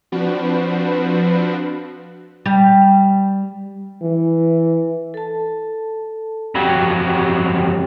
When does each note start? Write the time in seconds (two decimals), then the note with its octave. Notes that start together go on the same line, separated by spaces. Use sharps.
0.12 F3 C4 D4 F#4 B4
2.46 G3
4.02 E3
5.14 A4 A5
6.55 F2 F#3 G4 F#5 G5